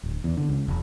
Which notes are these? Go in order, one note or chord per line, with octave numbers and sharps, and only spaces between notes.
D1
E2
D3
C#2
E1